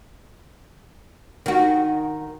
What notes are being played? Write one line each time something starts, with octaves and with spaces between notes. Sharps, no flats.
D#3 F#4